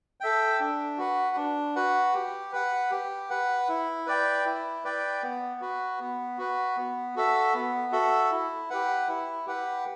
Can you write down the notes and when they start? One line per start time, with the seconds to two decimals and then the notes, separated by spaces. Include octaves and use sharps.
0.20 A4 E5 G5
0.60 D4
0.98 F#4 B4 F#5
1.36 D4
1.76 F#4 B4 F#5
2.14 G4
2.52 B4 F#5
2.91 G4
3.30 B4 F#5
3.69 E4
4.07 B4 D5 G5
4.45 E4
4.84 B4 D5 G5
5.23 B3
5.61 F#4 B4
6.00 B3
6.38 F#4 B4
6.77 B3
7.16 F#4 A4 E5
7.54 B3
7.92 F#4 A4 E5
8.31 E4
8.70 G4 B4 F#5
9.08 E4
9.47 G4 B4 F#5